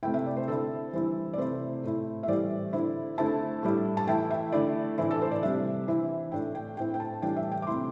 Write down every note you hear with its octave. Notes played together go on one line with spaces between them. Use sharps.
C3 A3 E4 G5
E5
D5
C5
D3 C4 E4 A4
E3 G3 C4 E4
D5
C3 A3 E4 C5
A2 A3 E4
E5
A2 E3 G3 C4 D5
D3 C4 E4
D3 A3 C4 E4 A5
A2 G3 E4
A5
E3 A3 E4 G5
E5
D3 A3 E4 D5
A2 E3 C4 E4
A4
C5
D5
C3 G3 D4 E5
E3 C4 E4
A2 A3 D4 G5
G5
A2 A3 C4 E4 G5
G5
A5
A2 E3 G3 D4 G5
E5
G5
D6
C3 A3 E4 C6